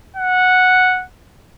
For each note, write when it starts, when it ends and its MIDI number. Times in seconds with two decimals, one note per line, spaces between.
0.16 1.04 78